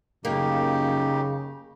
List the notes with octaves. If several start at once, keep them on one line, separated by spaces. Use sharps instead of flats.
F#2 C#3 A#3 D#4 G4